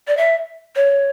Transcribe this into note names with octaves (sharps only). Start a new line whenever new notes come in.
D5
E5
C#5